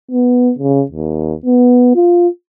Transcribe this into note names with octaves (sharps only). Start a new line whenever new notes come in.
B3
C#3
D#2
B3
F4